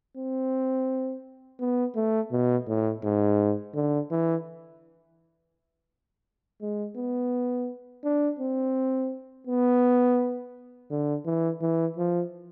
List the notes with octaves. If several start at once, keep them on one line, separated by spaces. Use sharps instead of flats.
C4
B3
A3
B2
A2
G#2
D3
E3
G#3
B3
D4
C4
B3
D3
E3
E3
F3